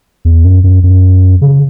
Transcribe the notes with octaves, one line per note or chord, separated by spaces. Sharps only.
E2
F#2
F#2
F#2
C#3